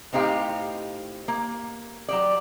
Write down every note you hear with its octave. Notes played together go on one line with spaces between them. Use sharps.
A2 C4 D#4 G4 F5
A#3
F#3 G4 D5